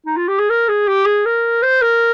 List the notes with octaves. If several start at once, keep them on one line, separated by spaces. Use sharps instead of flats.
D#4
F4
G4
G#4
A#4
G#4
G4
G#4
A#4
C5
A#4